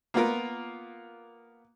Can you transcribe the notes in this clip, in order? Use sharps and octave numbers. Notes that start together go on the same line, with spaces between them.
A#3 B3 F4 A#4